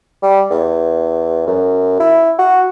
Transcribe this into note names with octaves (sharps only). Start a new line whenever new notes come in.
G3
E2
F#2
E4
F#4